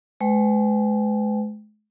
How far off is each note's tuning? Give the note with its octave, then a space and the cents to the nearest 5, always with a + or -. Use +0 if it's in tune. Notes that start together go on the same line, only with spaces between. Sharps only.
G#3 +40 B4 +40 G5 +0